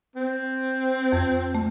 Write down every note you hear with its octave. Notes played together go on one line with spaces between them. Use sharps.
C4
F2
A3